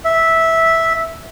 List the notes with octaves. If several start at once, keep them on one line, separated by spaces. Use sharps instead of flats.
E5